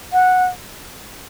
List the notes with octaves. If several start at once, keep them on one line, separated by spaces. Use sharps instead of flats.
F#5